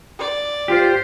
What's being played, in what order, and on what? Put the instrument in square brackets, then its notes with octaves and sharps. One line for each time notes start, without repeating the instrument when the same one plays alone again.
[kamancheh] D5
[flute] F4 [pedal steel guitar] G4 [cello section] C5